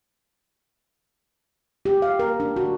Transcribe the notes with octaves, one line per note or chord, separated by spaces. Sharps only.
G4
F5
A#4
D4
F#4